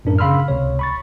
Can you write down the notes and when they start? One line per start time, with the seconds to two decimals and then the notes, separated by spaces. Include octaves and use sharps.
0.05 F#2 A2 D4 A#4
0.19 C#3 F5 B5 C6 E6 F6
0.48 C#2 C3 C#5
0.79 B5 C#6 A6